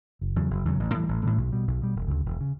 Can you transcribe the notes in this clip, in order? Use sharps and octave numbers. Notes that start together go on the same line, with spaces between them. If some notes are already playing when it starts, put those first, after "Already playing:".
F#1
E2 C#3 F#3
F#1
E2 C#3 F#3
A1
A2 E3 G3
A1
A2 E3 G3
B1
B2 G3
B1
B2 G3
E1
D2 C#3
E1
C#3